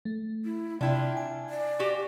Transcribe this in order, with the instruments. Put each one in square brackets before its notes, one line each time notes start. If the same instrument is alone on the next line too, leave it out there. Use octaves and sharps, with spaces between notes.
[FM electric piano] A3
[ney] E4
[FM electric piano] C3 [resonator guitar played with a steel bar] D4 E4 F4 [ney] G5
[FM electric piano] G#5
[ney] D5
[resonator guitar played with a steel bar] F#4 G4